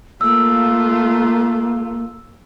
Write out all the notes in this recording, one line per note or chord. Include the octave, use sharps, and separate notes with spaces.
A3 A#3 F4 E6